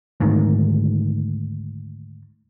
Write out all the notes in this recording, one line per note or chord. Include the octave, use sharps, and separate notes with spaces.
D2 G#2 D#3